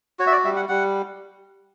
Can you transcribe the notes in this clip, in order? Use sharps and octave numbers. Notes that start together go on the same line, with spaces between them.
F#4 C#5
E5
D5
G3 E5
F#5
G3 F#5